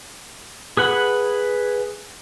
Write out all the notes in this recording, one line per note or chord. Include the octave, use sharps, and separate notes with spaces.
G#4 B4 F#5 B5